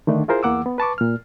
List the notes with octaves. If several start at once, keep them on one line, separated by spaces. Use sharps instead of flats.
D3 D#3 A3 D4
E4 F4 G#4 A#4 C5
E2 E3 A#3 F#5 D6 E6
B3
B4 A5 C#6 D6
A#2 F6